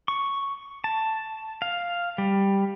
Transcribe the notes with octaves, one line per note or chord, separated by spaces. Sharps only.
C#6
A5
F5
G3